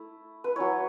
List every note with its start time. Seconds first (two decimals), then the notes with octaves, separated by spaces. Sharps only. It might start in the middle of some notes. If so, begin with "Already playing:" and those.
Already playing: A3 E4
0.44 B4
0.56 F#3 C#4 E4 C#5